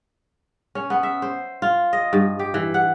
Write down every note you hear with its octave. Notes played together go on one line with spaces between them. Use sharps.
C#4
B3
E5
C5
F4
D#5
G2
G4
E3
F#5